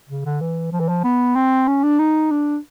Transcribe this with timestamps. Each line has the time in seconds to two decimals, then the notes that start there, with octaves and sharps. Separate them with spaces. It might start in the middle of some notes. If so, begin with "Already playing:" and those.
0.09 C#3
0.25 D3
0.41 E3
0.72 F3
0.80 E3
0.89 F3
1.04 B3
1.36 C4
1.68 C#4
1.83 D4
1.99 D#4
2.31 D4